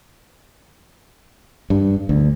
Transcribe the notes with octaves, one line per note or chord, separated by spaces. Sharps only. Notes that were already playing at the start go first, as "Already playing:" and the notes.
G2
D2